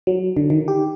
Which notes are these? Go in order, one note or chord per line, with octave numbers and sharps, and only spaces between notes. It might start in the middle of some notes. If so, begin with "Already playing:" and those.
F#3
D3
D#3
G4